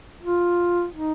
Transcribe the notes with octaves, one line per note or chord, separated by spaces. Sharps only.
F4
D#4